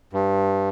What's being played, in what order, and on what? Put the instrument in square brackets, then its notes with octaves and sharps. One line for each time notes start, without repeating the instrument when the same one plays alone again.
[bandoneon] G2